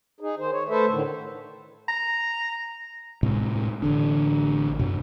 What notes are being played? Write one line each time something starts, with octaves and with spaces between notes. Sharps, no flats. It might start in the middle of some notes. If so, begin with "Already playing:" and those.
D#4 G#4
D#3 C5
C#5
A3 A4 B4 C5 E5
A2 D3 D#3
A#5
A2 C3 G#3
A1 D3 D4
F#2 B2